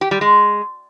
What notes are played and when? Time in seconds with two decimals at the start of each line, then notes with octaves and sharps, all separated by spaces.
0.01 G4
0.11 G3
0.21 G#3